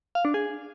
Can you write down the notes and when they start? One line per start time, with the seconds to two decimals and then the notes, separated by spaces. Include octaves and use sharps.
0.15 F5
0.25 D4
0.34 G#4